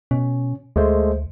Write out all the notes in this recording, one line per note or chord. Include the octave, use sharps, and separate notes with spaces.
B2 C#4
D2 G#3 A3 C5